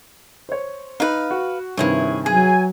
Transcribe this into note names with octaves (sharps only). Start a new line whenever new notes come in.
C5 C#5
D#4 B4 F5
F#4
G2 C3 D#3 E4 G#4 C#5
F#3 G#4 G#5